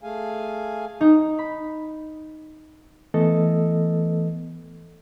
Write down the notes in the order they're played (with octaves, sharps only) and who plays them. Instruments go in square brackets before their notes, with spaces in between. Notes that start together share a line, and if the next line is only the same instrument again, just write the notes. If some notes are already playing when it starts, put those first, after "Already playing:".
[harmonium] A3 G#4 F5 G#5
[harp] D#4
B5
[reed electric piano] E3 A3 B3 A4 D#5